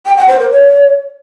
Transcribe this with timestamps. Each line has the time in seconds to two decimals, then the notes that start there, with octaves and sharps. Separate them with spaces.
0.06 G5
0.17 F#5
0.28 C5
0.39 A#4
0.50 C#5